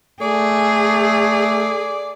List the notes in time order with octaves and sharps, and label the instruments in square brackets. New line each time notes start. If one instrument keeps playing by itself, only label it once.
[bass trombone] A3 [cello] G#4 [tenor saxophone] D5